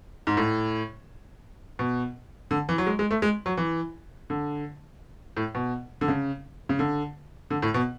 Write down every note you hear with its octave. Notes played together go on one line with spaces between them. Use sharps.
G#2
A2
B2
D3
E3
F#3
G#3
G#3
A3
G#3
F#3
E3
D3
A2
B2
D3
C#3
C#3
D3
D3
A2
B2